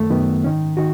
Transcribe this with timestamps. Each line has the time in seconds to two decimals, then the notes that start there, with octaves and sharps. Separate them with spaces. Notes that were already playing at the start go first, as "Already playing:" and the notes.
Already playing: F#2 D#3 A3
0.10 F#2 D#3 B3
0.44 G#2 D#3 C#4
0.77 D#3 F#4